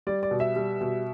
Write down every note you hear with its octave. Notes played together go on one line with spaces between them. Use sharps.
G3 D5
D5
B2
E5
G3
B2